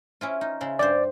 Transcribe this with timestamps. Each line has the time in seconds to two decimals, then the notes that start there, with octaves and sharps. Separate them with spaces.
0.21 C#4 E4 F4
0.41 D#4
0.61 C#3 E4 C6
0.79 G2 G4 C5 D5